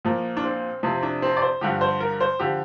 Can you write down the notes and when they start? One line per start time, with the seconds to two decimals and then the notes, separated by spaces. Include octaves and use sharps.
0.05 A#2 F3 A#3
0.37 D4
0.44 C4
0.83 F2 C3 F3 C4
1.03 D4
1.22 C4
1.37 D5
1.42 C5
1.61 G2 D3 F3 G4
1.81 C5
2.00 A#4
2.21 C5
2.40 D3 F3 G4